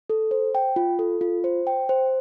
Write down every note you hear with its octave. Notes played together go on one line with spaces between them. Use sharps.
A4
C5
G5
F4
A4
F4
C5
G5
C5